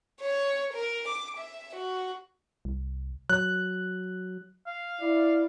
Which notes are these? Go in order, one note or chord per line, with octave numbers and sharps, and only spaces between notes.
C#5
A#4
D6
E5
F#4
C2
F#3 F#6
F5
E4 D5